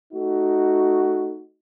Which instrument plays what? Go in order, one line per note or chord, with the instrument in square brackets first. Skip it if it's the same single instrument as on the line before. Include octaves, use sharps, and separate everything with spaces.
[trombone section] A3 D#4 F#4